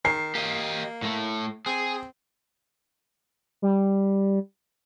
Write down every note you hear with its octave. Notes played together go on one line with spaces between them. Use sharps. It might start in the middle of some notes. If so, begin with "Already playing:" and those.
D#3 C7
A#3 G4 D#5
A2 A3
C4 G#4
G3